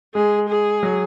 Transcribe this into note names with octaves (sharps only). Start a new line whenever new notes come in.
G#3 G#4
G#4
F#3